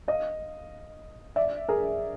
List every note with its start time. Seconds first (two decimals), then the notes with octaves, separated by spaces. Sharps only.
0.08 D#5 F5
1.36 D5 E5
1.69 G#4 A#4